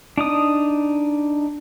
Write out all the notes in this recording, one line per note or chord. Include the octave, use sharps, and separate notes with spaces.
D4 D#4 D#6